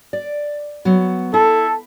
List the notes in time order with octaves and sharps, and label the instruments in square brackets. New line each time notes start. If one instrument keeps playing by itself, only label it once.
[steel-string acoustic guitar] D5
F#3 B3
[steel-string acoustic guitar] E4 [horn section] A4